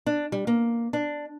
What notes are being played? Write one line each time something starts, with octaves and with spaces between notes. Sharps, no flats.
D4
G3
A#3
D4